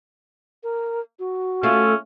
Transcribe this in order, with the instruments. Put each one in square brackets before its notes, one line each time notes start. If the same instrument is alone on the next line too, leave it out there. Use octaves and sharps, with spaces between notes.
[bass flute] A#4
F#4
[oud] A3 F4 [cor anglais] C#4